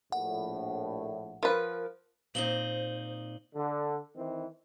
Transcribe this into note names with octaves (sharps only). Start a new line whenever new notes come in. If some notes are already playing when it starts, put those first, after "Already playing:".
A#1 A2 F#5
F3 A#4 B4
A#2 C4 D#4 C5 F#7 G7
D3
D#3 E3 C4